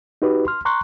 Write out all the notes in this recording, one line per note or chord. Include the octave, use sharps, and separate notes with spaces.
D#4 F#4 G4 B4
C6 F6
A#5 C6 C#6 F#6